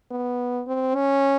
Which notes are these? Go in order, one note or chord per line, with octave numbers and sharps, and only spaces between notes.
B3
C4
C#4